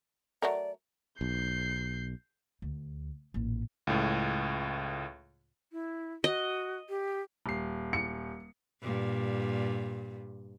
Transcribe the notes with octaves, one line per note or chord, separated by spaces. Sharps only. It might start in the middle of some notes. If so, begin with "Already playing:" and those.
F#3 A3 A#4 D5
B1 G6 C7
D2
A1 A#2
C#2 A2
E4
F#4 D#5
G4
D#1 C7
C#7
G2 A#2